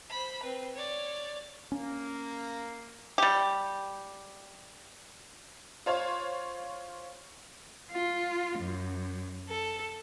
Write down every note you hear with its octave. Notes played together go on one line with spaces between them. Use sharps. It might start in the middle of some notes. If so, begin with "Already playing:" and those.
C5 B5
C4 B4
C#5 D5
A#3 C#4
G3 G4
F4 C5 C#5 F5
F4
F#2
A4